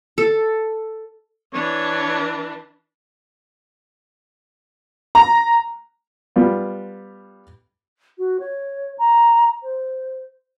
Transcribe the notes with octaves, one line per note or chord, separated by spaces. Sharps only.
A4
E3 D4 C#5
A#5
G3 B3 F4
F#4
C#5
A#5
C5